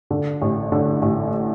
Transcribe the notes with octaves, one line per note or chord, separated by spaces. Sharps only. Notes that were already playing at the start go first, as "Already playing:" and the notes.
D3
A1
D3
A1